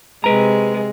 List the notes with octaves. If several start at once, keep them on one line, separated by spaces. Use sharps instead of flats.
C3 G#3 B4 A#5